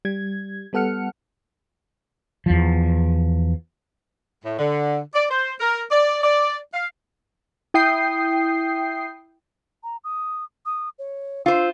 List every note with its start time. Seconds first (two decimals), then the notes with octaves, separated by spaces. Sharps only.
0.05 G3 G#6
0.73 G3 B3 A4 F#5 F6 C#7
2.46 E2 F3
4.44 A2
4.59 D3
5.15 D5
5.31 C5
5.60 A#4
5.91 D5
6.23 D5
6.74 F5
7.74 E4 G5 D#6 G6 C7
9.83 A#5
10.04 D#6
10.66 D#6
10.99 C#5
11.46 F4 C5 E6